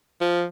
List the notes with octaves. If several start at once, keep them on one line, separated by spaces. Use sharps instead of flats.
F3